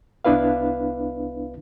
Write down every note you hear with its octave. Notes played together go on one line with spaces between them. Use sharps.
C2 B3 D4 E4 B4 F5